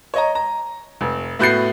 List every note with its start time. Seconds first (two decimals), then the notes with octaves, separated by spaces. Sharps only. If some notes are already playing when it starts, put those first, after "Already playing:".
0.14 C#5 D#5 A#5
0.35 A#5
1.01 F1
1.39 A2 B3 F#4 G6 A6 C7